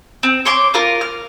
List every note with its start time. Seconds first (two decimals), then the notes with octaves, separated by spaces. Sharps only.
0.23 C4
0.45 C#5 C6 D6
0.74 F4 A#4 F5
1.01 F6